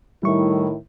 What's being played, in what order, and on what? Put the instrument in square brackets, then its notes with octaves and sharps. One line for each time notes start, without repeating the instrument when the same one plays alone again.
[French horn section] A2 D#3 E4 [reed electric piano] G3 C#6